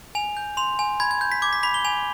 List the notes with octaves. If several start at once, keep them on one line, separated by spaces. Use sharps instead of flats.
G#5 F7
G6
C6 F7
G#5
B5 G#6
G#6
G6
B6
D6 G#6
B6
B5 B6
G7
G#5 F7